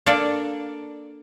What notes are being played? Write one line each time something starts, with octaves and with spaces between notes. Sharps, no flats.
A#3 D4 A4 D5